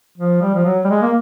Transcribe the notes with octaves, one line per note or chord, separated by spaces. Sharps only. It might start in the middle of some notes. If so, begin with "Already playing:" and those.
F3
G3
F3
F#3
G3
G#3
A#3